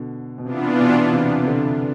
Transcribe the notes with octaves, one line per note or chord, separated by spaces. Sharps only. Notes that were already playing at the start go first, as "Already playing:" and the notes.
Already playing: B2 D3
B2
C3 E3 B3 D4 F4
B2
C3
C3
D3